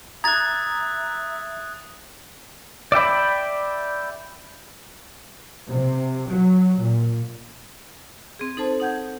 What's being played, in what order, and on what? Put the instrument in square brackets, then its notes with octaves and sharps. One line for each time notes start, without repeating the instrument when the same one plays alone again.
[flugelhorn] E5 [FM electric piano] A#5 [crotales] D#6 F#6 [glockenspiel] G#6 A6
[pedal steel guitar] D5 E5 G5 B5
[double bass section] C3
F#3
A#2
[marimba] C4 G#4
D#4 A4 C5 A5
D#4 F#5 G6 G#6